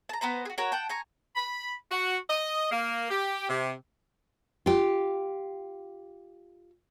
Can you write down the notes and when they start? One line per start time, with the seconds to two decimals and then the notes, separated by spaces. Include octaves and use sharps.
0.09 A5 A#5
0.21 B3 B4 C5 A#5
0.45 F#4 G#4
0.58 F#4 A#4 C#5 A#5
0.72 F#5 G5 A5
0.89 G#5 A#5 C#6
1.36 B5
1.91 F#4
2.29 D#5
2.71 A#3
3.10 G4
3.49 C3
4.66 F4 G4